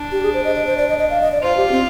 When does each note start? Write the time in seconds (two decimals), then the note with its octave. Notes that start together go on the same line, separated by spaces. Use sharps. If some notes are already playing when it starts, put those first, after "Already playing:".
Already playing: D4
0.12 G4
0.23 G#4
0.34 C5
0.44 D#5
0.56 D#5
0.67 C5
0.77 D5
0.88 D#5
0.98 D#5
1.10 F5
1.21 D#5
1.32 D5
1.42 F4 C5
1.57 G4
1.72 C4